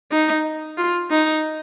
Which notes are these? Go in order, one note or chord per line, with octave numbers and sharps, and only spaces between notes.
D#4
F4
D#4